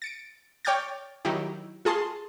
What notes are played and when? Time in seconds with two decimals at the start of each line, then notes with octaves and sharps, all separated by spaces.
0.02 A6 C#7 D7
0.65 C#5 G5 D6 F6 G6 A6
1.25 D#3 F#3 D#4 E4 G4
1.85 F4 G#4 A5 C6 C7